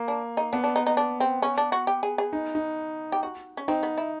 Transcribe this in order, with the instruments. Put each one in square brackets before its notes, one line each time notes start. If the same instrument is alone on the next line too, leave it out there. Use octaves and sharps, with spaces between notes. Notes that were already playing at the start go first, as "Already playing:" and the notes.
Already playing: [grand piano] A#3
[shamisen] D4
D#4
[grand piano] B3 [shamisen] D4
[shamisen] D4
D#4
D#4
D4
C4
C#4
D4
F#4
G4
G#4
G#4
[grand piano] D#4
D#4
[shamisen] G4
F#4
C#4
[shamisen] C4 [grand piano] D#4
[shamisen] B3
E4